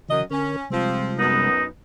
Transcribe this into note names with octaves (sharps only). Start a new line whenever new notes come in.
F#2 C#3 E3 D#5
D3 C#4 A#4
C3 F3 G3 G#3 C4
F#2 B3 D#4